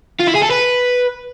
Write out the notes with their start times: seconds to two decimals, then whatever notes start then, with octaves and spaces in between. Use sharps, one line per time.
0.20 F4
0.28 E4
0.35 G#4
0.43 A4
0.51 B4